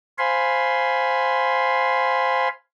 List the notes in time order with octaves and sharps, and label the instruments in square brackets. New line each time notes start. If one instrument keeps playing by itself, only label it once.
[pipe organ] C5 F5 G#5 B5 C6